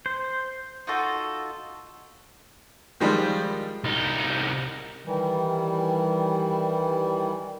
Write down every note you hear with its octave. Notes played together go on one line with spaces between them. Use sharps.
C5
D#4 F4 F#4 A4
D#3 F3 G3 G#3
C2 D#4
D#3 E3 G3